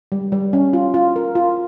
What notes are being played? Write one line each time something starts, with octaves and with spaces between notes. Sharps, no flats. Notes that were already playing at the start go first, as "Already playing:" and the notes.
G3
G3
C#4
F4
F4
A#4
F4